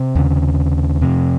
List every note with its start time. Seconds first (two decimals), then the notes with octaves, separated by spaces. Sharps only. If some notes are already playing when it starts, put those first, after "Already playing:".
Already playing: C3 C4
0.15 D#2 C#3
1.02 F2 C3